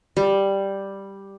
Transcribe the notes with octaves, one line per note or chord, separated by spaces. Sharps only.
G3